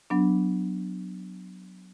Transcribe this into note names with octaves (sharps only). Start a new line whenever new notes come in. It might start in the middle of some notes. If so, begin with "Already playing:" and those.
F#3 B3 D4